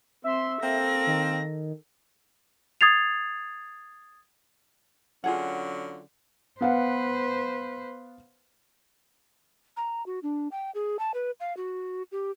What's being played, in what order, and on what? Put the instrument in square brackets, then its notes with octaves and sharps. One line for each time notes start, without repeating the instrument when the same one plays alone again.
[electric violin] C4 C6 [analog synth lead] E5
[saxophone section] A#3 C4 [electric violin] A4 A#6
[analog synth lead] D#3
[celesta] D#6 G#6 A6 C7 F7
[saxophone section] D3 F#3 C#4 [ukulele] F4 G#4 F#5
[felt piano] B3 F5 F#5 [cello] B4 C5
[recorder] A#5
F#4
D4
G5
G#4
A5
B4
F5
F#4
G4